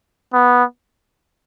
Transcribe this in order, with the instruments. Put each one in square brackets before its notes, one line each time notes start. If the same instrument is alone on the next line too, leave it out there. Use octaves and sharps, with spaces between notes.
[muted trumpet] B3